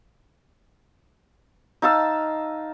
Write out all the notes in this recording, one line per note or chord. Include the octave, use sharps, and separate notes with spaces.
D#4 F5 A5 E6